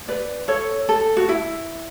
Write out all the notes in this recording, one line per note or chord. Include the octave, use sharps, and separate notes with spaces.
B4 D5
A4 C#5
A4
F#4
E4